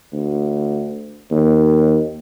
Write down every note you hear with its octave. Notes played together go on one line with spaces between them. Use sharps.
D2
D#2